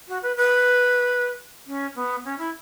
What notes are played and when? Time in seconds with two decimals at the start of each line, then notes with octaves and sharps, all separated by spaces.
0.08 F#4
0.23 B4
0.36 B4
1.67 C#4
1.95 B3
2.25 C#4
2.38 E4